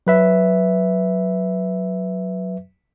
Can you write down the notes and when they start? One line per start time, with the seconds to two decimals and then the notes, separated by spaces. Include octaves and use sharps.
0.07 F#3 B4 E5